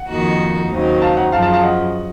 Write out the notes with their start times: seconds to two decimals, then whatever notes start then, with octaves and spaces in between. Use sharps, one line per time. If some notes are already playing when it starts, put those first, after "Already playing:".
Already playing: F#5
0.08 F2 D#3 A#3 D#4 F#4
0.71 D#2 C#3 F#3 C4 D#4
1.02 F5 A5
1.17 F#5 A#5
1.32 F#2 C#3 F3 F5 A5
1.42 F5 A5
1.53 F5 A5
1.63 D#5 F#5